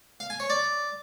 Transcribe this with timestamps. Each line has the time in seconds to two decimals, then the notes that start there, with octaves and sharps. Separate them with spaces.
0.20 F5
0.30 G#5
0.40 C#5
0.50 D5